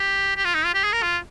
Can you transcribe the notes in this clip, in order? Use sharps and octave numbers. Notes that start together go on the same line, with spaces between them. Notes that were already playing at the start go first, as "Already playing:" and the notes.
Already playing: G4
G4
F4
D#4
F4
G4
G#4
A#4
F4